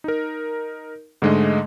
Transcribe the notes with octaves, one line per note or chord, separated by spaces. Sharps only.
D#4 A#4
G#2 D3 G#3 A3 D#5